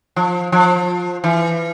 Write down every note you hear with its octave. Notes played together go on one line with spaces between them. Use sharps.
F3
F3
E3